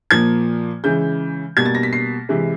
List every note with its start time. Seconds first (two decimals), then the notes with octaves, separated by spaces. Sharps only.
0.11 A#2 F3 A#3 G#6
0.84 C#3 E3 G#3 G6
1.57 B2 G3 A#3 G#6
1.65 A6
1.75 A#6
1.83 B6
1.93 C7
2.29 C3 E3 G#3